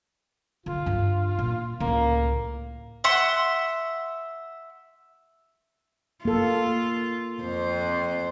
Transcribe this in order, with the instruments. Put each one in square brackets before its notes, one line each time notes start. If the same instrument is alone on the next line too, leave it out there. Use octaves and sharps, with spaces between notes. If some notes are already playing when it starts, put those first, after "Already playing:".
[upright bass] D3 [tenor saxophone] F4
[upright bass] G2 D4
A#2
[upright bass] C#2 A2 [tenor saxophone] A#3
[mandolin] E5 F#5 C6
[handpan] A#3 A4 [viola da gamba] F4
[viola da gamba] F2 C5